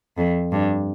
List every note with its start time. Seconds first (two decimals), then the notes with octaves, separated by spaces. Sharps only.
0.17 F2
0.52 G2